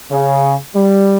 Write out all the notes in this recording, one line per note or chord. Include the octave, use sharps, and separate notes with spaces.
C#3
G3